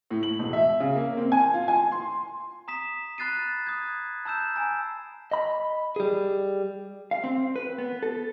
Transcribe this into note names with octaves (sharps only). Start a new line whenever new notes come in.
A2
F#7
E1
E5
C#3
A#3
C4
G#5
F4
G#5
C6
A#5 D#6 B6 E7
B5 F#6 A6 C7 D#7
D#6 G#6
A5 A#5 E6 G6 E7
G#5 A#5
D#5 B5
G3 G#4
F5
C4
B4
B3
A4